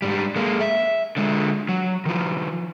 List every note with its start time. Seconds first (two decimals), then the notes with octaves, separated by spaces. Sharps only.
0.02 G#2 G3
0.36 G#3 A#3
0.61 E5
1.17 D3 G#3
1.69 F#3
2.06 D#3 F3